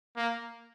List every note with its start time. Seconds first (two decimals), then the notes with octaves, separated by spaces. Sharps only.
0.17 A#3